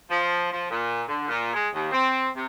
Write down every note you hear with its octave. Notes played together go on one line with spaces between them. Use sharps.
F3
F3
A#2
D3
A#2
G#3
D#2
C4
C3